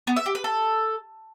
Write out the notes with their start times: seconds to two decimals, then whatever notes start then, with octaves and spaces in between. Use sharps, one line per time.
0.07 B3
0.16 E5
0.26 G4
0.35 B4
0.44 A4